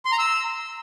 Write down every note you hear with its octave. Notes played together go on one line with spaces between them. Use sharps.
C6
A#5
E6